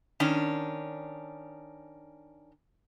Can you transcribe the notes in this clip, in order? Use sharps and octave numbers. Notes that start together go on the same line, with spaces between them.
D#3 C#4 D4